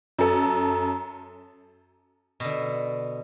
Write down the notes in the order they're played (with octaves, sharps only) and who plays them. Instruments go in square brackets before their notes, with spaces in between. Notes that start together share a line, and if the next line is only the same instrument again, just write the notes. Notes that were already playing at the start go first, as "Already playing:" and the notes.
[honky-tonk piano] F#2 A4
[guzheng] B2 D3